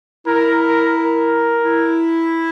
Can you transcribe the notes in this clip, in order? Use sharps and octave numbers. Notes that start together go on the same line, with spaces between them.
E4 A#4
A#4
A#4
E4